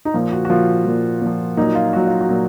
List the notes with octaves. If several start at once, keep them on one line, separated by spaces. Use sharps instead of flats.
D#4
A#2 F3 F4
F#4
F#4
A#2 F3 F4
A#2 F3
A#2 F3
A#2 F#3 D#4
F4
A#2 F#3 F#4
F4
F#4
A#2 F#3